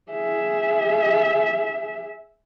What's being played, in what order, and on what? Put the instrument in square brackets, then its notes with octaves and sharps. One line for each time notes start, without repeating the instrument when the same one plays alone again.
[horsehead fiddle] G#4 E5